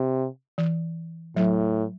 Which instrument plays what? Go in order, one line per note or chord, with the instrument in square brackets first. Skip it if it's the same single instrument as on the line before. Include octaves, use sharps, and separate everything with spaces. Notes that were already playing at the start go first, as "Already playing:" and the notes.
Already playing: [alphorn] C3
[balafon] E3
[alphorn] A2 [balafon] F#3